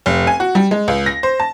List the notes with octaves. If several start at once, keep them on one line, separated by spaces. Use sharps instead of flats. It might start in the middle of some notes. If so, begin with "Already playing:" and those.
F1
G#5
F#4
G3
G#3
C#2
A#6
C5
A5